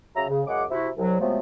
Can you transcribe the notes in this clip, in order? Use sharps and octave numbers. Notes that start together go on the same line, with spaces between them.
C#3 F#3 E5 A#5
C#3
F#2 C#3 G#3 F#5 D6
C3 E4 F#4
C2 F#3
C3 F3 F#3 G#3 A3 B3